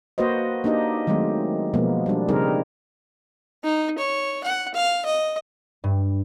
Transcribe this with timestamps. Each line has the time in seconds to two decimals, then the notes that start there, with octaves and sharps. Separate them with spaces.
0.18 A#3 F#4 B4 C5 D#5
0.64 A#3 D4 D#4 G4 D#5
1.07 D#3 F#3 G#3 A3 C4
1.74 B2 F3 G#3 A#3 B3
2.06 G3 D4
2.29 C#3 G3 C4 D#4 G#4 A#4
3.64 D#4
3.98 C#5
4.44 F#5
4.74 F5
5.05 D#5
5.84 G2